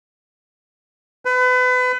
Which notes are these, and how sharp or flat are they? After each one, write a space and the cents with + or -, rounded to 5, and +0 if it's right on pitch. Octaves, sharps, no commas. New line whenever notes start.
B4 +30